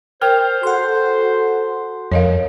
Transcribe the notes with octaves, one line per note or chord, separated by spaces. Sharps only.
A#4 C5 G5 F6
F#4 A4 F#5 C6
F2 A#4 C#5 D#5 F5